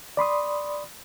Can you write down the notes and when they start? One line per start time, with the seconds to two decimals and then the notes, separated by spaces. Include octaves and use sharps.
0.17 D5 B5 C6 D#6